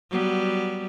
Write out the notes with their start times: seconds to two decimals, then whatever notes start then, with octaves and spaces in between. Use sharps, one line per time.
0.11 F#3 G3 B3